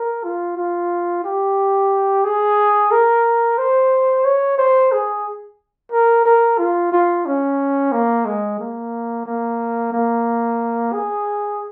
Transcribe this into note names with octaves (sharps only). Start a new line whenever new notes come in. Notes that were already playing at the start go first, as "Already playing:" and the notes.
Already playing: A#4
F4
F4
G4
G#4
A#4
C5
C#5
C5
G#4
A#4
A#4
F4
F4
C#4
A#3
G#3
A#3
A#3
A#3
G#4